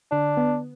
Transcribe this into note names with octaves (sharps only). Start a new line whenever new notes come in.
D3 D4
B3